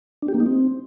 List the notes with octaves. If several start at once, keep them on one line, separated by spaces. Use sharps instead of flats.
D4
G4
A#3
D#4
C4